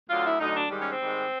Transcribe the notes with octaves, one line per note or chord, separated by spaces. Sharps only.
D2 D3 F#3 F4
E4
D2 D3 F#3 D#4
D4
G#2 D#3 G3
C#4
C4
G#2 D#3 G3